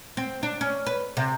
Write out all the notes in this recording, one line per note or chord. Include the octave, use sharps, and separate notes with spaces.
C4
D4
C#4
B4
C3